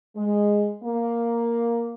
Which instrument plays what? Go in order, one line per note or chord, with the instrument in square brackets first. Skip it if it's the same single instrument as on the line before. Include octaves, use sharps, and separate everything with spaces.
[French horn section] G#3
A#3